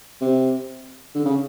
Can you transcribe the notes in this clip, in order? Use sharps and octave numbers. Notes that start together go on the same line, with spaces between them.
C3
D3
C#3